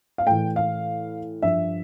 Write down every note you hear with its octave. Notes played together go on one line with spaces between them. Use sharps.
F5
A2 E3 G5
F5
G2 F3 E5